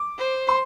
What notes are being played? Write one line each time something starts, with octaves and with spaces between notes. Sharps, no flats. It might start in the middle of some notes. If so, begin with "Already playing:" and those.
Already playing: D6
C5
C6